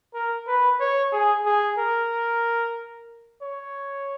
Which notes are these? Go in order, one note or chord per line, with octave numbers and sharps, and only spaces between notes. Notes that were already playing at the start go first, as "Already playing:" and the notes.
A#4
B4
C#5
G#4
G#4
A#4
C#5